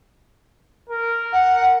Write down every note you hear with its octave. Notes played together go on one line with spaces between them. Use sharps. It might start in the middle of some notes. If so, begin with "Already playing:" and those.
A#4
F#5